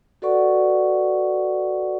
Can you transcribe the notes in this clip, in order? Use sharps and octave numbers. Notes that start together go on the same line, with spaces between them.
F#4 A4 B4 D5 F#5 C#6